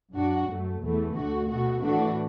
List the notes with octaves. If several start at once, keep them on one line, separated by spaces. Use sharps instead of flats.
F#2 F#3 D4 F#4
F#2 F#3 A3
E2 E3 A3
D2 D3 A3 F#4
B2 A3 F#4
A2 E3 A3 D4 F#4